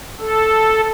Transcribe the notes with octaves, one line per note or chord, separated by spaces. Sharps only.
A4